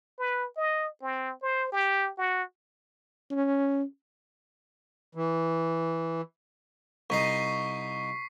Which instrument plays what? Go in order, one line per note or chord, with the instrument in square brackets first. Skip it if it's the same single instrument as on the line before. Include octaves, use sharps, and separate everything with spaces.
[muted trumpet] B4
D#5
C4
C5
G4
F#4
[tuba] C#4
[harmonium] E3
[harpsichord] C2 D#4 D#5 [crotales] C#6 B6 C7